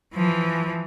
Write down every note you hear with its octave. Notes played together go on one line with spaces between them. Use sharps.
E3 F3